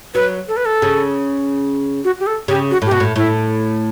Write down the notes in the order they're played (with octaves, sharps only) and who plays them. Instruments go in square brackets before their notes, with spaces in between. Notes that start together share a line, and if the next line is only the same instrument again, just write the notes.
[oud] F#3 [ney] B4
[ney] A4
B4
A4
[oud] C#3
[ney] F#4
G4
A4
[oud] C#3 [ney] G4
[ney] F#4
[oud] A2
[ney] G4
[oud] B2 [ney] F#4
[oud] A2
[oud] A2 [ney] E4